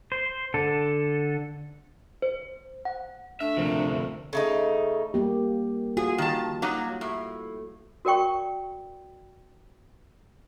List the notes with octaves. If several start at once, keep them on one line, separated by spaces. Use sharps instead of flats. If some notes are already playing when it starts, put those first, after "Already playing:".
C5
D3 A4
C5
F#5
A3 D4 E5
D2 C3 F3 C4 A#4
C#3 A3 D#4
G3 A#3 G4
F4 F#4 G#4
D#3 A5
F#3 A#3 D#4
A2
F#4 A#4 D5 G5 C#6